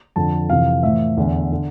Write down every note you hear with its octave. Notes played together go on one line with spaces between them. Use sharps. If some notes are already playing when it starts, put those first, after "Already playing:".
F2 D3 A5
F2 C3 E3 F5
A2 E3 E5
E2 D3
D3